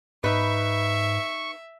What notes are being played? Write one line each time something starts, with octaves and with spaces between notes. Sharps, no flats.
G#2 D#4 B4 E5 C#6